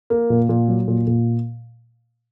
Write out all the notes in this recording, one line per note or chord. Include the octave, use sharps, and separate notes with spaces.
A#3
A#2
A#2
F#3
A#2
A#2